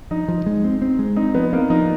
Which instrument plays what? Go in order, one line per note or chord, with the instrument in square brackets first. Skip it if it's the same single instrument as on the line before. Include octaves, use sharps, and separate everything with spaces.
[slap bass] F3 [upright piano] D#4
[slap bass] F3
G#3
C4
C4
G#3
[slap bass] C4 [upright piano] D#4
[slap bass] F3 [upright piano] B3
[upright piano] A#3 [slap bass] C4
[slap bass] F3 [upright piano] D#4